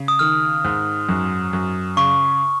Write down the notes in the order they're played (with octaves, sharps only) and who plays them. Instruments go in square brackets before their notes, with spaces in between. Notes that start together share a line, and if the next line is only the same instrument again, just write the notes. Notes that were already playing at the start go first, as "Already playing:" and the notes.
Already playing: [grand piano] C#3
[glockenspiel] D#6
[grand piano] D#3 [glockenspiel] F6
[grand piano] G#2
F#2
F#2
[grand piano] C#3 [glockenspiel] C#6